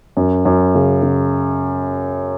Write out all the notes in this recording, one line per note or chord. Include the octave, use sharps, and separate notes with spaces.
F#2
F#2
C#3
C#3